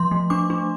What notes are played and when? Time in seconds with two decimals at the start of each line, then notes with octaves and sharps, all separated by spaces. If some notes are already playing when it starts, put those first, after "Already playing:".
Already playing: F3 C6
0.11 A3
0.30 D4 D6
0.50 D4